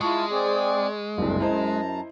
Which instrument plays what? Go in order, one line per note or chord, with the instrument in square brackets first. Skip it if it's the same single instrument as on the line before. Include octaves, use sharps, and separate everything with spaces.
[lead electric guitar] G#3 [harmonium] E4 F4 A5 [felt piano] C#6
[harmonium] C4 G#4 D5
[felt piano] F#1 C2 [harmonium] D4
[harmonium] F#2 A5 A#5 [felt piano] E4 C5 D#5